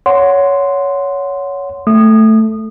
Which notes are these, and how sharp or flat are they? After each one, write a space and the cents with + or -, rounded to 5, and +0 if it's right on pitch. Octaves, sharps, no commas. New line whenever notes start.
C#5 +15 F#5 -10 C6 -10
A3 +0 D#6 -25